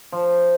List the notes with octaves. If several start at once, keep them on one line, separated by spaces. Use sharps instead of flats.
F3